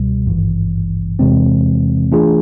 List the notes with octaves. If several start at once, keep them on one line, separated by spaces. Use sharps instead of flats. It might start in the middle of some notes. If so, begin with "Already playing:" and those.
Already playing: C#2 B2 G3
G#1 G2 E3
E2 C3 E3 G#3 C4
E3 A3 D4 F4 G#4